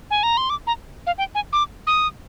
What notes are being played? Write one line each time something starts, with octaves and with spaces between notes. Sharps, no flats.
G#5
A#5
C6
D6
A#5
F5
G5
G#5
D6
D#6